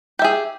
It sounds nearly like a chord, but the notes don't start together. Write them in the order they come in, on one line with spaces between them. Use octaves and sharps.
G4 E5 G#4